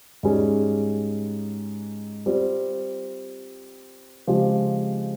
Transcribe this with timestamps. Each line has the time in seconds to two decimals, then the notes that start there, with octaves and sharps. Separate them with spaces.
0.23 G#2 G3 C#4 G#4
2.26 G3 C4 F4
4.27 C#3 F3 G#3 C4 G4